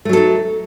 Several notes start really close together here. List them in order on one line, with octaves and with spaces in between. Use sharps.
A3 F#3 A4 D#4